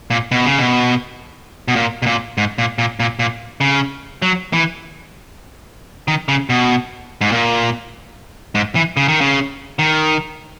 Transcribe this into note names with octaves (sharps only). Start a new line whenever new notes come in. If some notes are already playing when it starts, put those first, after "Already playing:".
A#2
B2
C#3
B2
B2
A#2
B2
A#2
G#2
A#2
A#2
A#2
A#2
C#3
F#3
E3
D#3
C#3
B2
G#2
A#2
G#2
E3
C#3
D#3
C#3
D#3